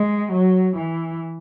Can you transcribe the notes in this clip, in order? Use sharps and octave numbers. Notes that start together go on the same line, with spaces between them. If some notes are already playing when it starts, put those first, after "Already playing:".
Already playing: G#3
F#3
E3